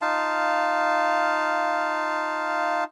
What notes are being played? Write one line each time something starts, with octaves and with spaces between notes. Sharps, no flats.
D#4 F4 F5 A5